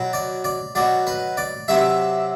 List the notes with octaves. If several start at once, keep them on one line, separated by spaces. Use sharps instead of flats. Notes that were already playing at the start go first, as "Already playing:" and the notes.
Already playing: B2 F#3
D5
D5
B2 F#3 D5
B4
D5
C3 F#3 E5